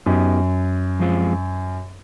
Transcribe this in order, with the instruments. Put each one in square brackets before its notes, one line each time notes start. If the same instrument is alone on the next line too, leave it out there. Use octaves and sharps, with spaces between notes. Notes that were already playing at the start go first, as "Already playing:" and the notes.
[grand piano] F#2 [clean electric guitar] B3 D#4 G4
[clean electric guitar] F3 G#3 C4 F4